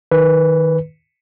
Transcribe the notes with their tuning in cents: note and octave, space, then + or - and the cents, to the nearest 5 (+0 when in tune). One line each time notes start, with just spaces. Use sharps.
D#3 +5 B4 +0